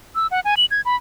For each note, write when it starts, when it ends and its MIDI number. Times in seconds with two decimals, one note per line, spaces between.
0.15 0.27 88
0.31 0.40 78
0.45 0.55 80
0.57 0.65 102
0.71 0.81 92
0.85 0.96 83